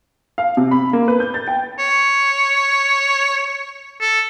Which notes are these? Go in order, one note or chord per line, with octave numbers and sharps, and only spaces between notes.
F5
C3
B5
A#3
B4
G6
A6
G5
C#5
A4